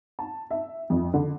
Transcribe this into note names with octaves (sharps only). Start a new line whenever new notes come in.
A5
E5
F2
D3